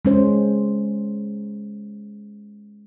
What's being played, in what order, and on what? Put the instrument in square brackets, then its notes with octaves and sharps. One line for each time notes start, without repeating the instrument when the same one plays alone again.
[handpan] G#3 C#4 C5